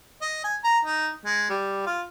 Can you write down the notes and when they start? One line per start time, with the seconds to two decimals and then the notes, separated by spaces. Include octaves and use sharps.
0.21 D#5
0.44 G#5
0.64 A#5
0.85 D#4
1.25 G#3
1.50 G3
1.86 F4